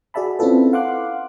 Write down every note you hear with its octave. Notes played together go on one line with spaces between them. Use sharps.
F#4 G#4 D5 E5 A5 B5
C4 C#4 E4 F4 A4 B4
F5 F#5 C6 D6 F#6